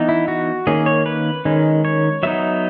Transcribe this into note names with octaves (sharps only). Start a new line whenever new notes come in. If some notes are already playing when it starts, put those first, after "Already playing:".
Already playing: E3 B3 D#4
E4
F#4
D#3 A#3 C#4 G#4
C#5
B4
D#3 G#3 C#4
C#5
F#3 B3 D#4 E5